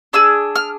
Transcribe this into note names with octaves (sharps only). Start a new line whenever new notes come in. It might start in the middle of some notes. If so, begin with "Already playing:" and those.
D4 G#4 E6
F6